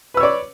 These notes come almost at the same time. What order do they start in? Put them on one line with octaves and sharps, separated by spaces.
B4 E6 C#5 D5